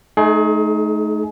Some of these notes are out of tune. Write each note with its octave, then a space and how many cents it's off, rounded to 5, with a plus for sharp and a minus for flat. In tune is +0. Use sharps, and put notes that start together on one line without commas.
A3 -30 D#4 +0 G#4 +30